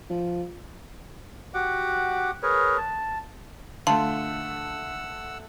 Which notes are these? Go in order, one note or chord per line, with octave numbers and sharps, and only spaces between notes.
F3
F#4 G4 F#5 D6
G#4 A#4 B4 C#5
A5
D3 A3 F4 F#5 A5 E6